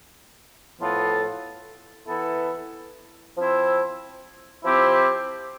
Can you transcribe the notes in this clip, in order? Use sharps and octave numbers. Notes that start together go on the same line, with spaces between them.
A2 F3 B3 F4 A4
E3 B3 E4 A4
F3 C4 E4
F3 C4 E4 G4